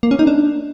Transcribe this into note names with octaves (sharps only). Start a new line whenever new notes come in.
A#3
C#4
D#4
D4